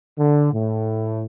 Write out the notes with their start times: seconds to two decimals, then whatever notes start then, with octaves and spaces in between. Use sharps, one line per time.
0.19 D3
0.53 A2